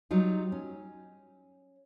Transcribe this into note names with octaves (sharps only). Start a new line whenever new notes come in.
F#3 G3 D#4 F4
C#4